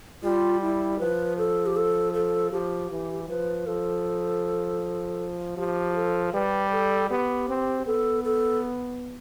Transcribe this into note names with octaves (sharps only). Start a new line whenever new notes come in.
G3 F4
E4
F3 B4
A4
G4
A4
A4
F3 G4
E3
F3 B4
F3 A4
F3 G4
A4
G3 B4
A4
B3 G4
C4
B3 A4
A4